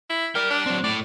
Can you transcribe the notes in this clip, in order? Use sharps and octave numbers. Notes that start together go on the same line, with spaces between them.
E4
A#4 D5 G5
D4
F#3 C4
A2 D5